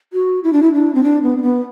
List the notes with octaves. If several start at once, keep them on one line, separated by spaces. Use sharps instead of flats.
F#4
E4
D4
E4
D4
C4
D4
B3
C4
B3